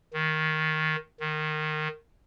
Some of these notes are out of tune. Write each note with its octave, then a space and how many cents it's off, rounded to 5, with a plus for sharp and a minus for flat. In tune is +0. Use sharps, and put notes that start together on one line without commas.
D#3 +5
D#3 -15